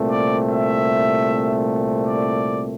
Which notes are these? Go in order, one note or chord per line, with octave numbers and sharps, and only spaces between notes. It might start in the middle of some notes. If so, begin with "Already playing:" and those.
Already playing: C2 A#2 A3 C4
D5
E5
D5